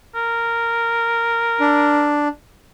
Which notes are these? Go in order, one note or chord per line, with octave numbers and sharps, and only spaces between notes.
A#4
D4